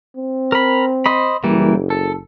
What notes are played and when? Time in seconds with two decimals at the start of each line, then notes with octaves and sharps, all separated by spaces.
0.17 C4
0.52 A#4 B5
1.06 C5 D#5 B5
1.44 F#1 E3 G3 A#3
1.90 A4